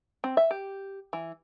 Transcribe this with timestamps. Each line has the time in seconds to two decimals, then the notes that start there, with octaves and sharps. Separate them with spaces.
0.24 C4
0.37 E5
0.51 G4
1.13 E3